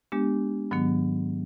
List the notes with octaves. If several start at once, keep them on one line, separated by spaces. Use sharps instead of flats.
G#3 B3 D4 G4
G#2 D#3 F#3 B3